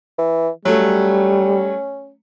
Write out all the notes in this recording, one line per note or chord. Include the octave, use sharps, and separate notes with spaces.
E3
F#3 G3 A3 C#4